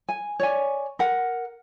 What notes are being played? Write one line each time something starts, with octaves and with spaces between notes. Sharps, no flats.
G#5
C#5 D5 G#5
A#4 F#5